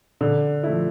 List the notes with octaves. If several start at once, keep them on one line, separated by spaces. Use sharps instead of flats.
D3
F3 A3 E4